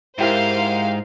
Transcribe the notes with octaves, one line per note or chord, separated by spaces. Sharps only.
G#2 E4 G4 A#4 C5 F5